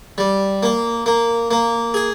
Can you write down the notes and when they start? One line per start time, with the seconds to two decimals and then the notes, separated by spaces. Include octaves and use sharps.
0.18 G3
0.63 A#3
1.06 A#3
1.51 A#3
1.94 G#4